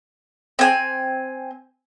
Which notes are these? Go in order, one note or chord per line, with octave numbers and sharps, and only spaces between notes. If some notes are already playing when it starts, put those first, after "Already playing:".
C4 G#5